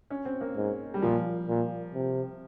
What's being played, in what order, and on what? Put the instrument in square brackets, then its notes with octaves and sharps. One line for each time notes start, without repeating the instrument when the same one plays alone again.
[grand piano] C#4
C4
A#3
[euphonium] G#2
[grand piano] G3
[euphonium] A#2 [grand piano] F3
[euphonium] A#2
C3